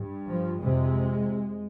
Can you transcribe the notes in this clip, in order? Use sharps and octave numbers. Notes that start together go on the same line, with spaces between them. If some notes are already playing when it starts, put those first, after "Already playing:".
Already playing: G2
F3
F2 C3 G#3